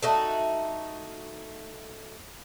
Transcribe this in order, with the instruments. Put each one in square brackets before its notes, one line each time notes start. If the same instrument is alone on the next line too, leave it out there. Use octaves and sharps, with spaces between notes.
[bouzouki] A3 D#4 F#4